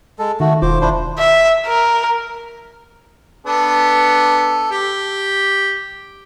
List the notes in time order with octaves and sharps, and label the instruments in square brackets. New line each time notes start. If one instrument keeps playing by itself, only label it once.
[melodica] G#3 A4
[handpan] D#3 [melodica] A3 F#4
[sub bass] E1 [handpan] F4 [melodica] C5 D6
[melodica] D4 E4 C5
[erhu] E5
A#4
[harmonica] B3 D4 A4
G4